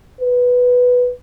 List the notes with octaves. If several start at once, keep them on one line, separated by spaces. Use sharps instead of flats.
B4